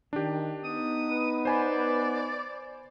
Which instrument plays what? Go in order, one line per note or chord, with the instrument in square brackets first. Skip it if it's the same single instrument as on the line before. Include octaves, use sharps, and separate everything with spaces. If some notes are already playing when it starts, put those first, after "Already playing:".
[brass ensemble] D#3 [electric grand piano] D4 G4
[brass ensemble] B3 D#4 [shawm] D#6
[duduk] B4
[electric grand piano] C5 G#5 B5 [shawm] D5